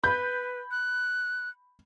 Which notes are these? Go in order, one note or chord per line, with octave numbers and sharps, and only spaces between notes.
B4 B5 G6
F#6